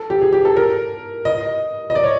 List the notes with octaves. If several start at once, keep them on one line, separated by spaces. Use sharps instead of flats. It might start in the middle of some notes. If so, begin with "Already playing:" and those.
Already playing: A4
G4
G#4
G4
A4
A#4
D#5
D#5
D5
C#5